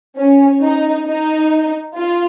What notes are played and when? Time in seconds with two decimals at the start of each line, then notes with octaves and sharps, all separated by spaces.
0.16 C#4
0.61 D#4
1.06 D#4
1.96 F4